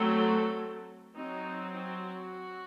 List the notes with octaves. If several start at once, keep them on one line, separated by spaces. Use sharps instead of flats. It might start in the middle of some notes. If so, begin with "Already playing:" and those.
Already playing: F#3 A3 C4 A4
F#3 C4 D#4
F#4